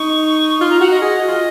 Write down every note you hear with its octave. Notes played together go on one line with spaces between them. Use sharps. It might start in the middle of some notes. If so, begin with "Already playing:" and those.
Already playing: D#4 C#6
F4 C6
A#5
F#4 F#5
D#5
G#4 D#5
F#4
F4